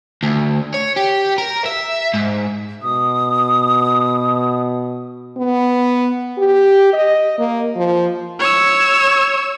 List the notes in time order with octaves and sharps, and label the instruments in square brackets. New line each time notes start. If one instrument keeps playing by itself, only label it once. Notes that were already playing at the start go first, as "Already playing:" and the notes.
[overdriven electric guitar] D2
C#5
G4
A#4
E5
G#2
[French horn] B2 [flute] D#6
[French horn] B3
G4
D#5
A#3
F3
[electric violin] C#5 E6